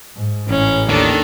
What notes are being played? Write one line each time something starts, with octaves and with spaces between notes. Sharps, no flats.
G#2
A1 C#4
D#2 D#3 D4 A4